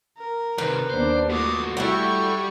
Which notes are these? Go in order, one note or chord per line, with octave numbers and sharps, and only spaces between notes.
A#4
C3 D#3 B4
D#2 B3 D4 C5
A3 B3 F4 F#4 D6 D#6
G3 E4 G4 A4 F#5 G5 C#6